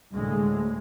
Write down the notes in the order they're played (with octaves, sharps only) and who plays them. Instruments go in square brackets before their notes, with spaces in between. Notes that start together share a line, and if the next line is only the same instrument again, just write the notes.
[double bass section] D2 A2 G#3